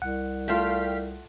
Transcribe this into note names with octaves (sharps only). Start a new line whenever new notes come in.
C2 F#5
A3 F4 F5 G5 B6